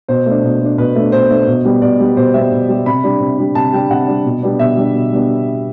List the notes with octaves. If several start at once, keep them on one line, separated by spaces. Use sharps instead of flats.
B2 C5
A3 D4
B2
A3 D4
B2 B4
A3 D4
B2 C5
A3 D4
B2
G3 B3
B2 D5
G3 B3
B2 C5
G3 B3 E5
B2
G3 B3
C3 B5
G3 D4
C3
G3 D4
C3 A5
G3 D4 G5
C3 F#5
G3 D4
B2
G3 B3 D4
B2 E5
G3 B3 D4
B2
G3 B3 D4